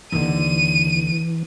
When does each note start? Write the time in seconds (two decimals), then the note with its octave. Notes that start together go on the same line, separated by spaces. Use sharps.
0.12 D#2 D3 E3 D#7